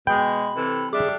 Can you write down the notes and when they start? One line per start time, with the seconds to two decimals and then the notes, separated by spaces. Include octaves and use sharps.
0.07 B2 G#3 G5 B5
0.56 C3 E3 A4
0.93 G3 D4 G#4 E5 D6